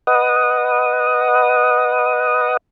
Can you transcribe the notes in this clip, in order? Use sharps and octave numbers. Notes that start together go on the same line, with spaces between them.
B4 D#5 F#5 D#6